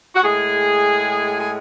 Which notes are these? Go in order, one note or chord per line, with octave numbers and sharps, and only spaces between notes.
F#4
A2 G#3 G#4
G#4